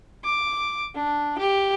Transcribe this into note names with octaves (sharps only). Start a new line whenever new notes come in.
D6
D4
G4